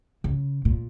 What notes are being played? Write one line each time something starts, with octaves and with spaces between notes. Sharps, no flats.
C#3
A#2